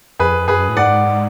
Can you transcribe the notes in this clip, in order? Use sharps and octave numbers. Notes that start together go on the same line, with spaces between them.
F2 G#4 B4
F#2 G#4 B4
A2
G#2 D5 F#5